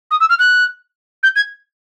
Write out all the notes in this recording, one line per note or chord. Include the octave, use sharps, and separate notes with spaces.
D#6
E6
F6
F#6
G6
G#6